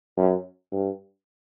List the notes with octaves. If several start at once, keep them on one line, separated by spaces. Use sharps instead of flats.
F#2
G2